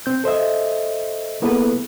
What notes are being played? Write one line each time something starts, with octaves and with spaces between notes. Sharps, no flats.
C4 G6
A4 C5 D#5 E5
A#3 B3 E4 G#4 A4 B4